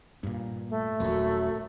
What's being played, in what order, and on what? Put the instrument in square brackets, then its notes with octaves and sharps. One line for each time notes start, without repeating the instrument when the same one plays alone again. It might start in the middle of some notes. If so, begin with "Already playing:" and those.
[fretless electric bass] G2 A#2
[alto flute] A3
[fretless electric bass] D#1 [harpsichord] F#2 F#3